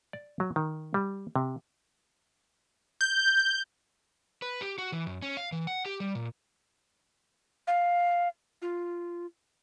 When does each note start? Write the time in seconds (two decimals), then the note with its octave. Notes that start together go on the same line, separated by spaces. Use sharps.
0.13 D5
0.40 F#3
0.56 D#3
0.94 G3
1.36 C3
3.01 G6
4.42 B4
4.61 G4
4.78 F#4
4.92 E3
5.06 F#2
5.22 C#4
5.37 F5
5.52 E3
5.67 F#5
5.86 G4
6.00 G3
6.15 A#2
7.67 F5
8.62 F4